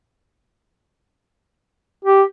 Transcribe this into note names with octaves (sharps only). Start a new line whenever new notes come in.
G4